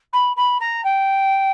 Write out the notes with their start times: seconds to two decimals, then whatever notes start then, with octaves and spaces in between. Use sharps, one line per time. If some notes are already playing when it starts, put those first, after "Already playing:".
0.12 B5
0.36 B5
0.60 A#5
0.84 G5